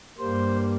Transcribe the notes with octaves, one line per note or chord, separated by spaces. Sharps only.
G2 G3 A#3 C5